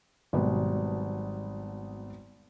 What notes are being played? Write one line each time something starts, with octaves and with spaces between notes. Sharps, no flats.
G#1 B2 F#3 G3 B4